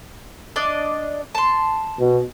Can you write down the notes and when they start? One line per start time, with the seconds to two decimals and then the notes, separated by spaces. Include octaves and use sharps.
0.56 D4 D5 D#5
1.35 A5 C6
1.99 B2